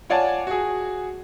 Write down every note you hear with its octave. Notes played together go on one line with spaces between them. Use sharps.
F4 C#5 D5 F#5 G#5 A5
F#4 G#4